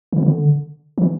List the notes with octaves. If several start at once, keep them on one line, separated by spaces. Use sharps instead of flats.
D3
D3
E3